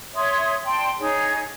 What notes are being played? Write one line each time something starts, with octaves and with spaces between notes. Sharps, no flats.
C#5 E5 C6 D#6
D5 G5 A5 C6
D#4 G#4 C#5